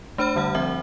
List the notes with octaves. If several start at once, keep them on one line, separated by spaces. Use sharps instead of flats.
A3 D4 C5 B5 F6
D3 G3 F#5 F6
F3 C4 E5